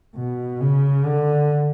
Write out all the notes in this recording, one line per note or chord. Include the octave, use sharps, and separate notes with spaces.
B2
C#3
D3